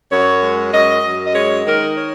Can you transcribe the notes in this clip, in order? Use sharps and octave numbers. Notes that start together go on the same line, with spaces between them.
F#2 C#5
G#3
F#2 D#5
F#2
D#5
G#3 C#5
D#3 A#4
C#5